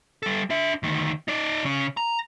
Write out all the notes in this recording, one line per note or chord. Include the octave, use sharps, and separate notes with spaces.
G3 A4
D4 E5
D2 D#3
D#4 D5
C#3 C#4
A#5